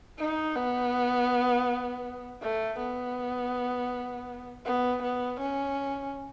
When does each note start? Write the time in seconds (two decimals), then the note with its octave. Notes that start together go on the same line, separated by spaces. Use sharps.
0.18 D#4
0.55 B3
2.42 A3
2.79 B3
4.65 B3
5.02 B3
5.40 C#4